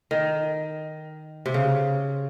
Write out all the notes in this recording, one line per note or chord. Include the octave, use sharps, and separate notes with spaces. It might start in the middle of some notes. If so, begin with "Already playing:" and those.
D#3
C3
C#3